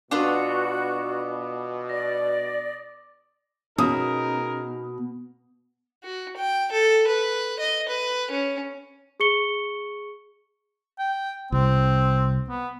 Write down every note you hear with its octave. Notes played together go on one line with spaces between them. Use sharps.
B2 D4 F4 F#4 B4 D6 D#6
D5 A#6
B2 C#4 D#4 G#4 A#4 D#6
F#4
G5
A4
B4
D#5
B4
C#4
G#4 C#6 C#7 G7
G5
C2 C4
B3